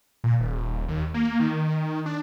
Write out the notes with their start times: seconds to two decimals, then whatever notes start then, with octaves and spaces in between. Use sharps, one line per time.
0.24 A#2
0.40 D#1
0.88 D#2
1.14 A#3
1.40 D#3
2.06 D4